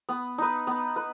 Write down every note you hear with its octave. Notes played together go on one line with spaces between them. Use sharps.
B3
D#4 B4
B3
B4